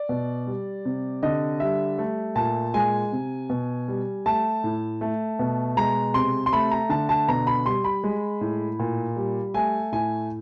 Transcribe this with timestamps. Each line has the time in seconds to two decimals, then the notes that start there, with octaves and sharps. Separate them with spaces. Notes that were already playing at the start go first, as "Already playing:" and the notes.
Already playing: D5
0.09 B2
0.47 G3
0.85 C3
1.23 D3 D#5
1.60 G3 E5
1.98 A3
2.36 A#2 A5
2.74 G#3 G#5
3.12 C3
3.50 B2
3.88 G3
4.26 A3 A5
4.64 A2
5.01 A3
5.39 B2
5.77 G#3 A#5
6.14 C3 C6
6.46 C6
6.53 A3 B5
6.71 A#5
6.89 D3 A5
7.09 A5
7.28 B2 A#5
7.47 B5
7.66 G3 C6
7.84 B5
8.04 G#3
8.41 A2
8.80 A#2
9.16 G3
9.54 A3 G#5
9.92 A2 G#5